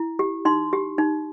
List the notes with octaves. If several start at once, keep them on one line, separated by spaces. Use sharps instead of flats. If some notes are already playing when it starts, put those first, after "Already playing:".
Already playing: E4
G4
D#4 C6
G4
D#4